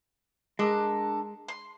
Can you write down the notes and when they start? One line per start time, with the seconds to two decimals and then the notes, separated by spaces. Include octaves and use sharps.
0.59 G#3 D4 A4 A#4
1.48 C6